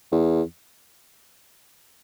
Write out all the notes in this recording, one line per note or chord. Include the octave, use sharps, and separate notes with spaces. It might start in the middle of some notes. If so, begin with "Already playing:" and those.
E2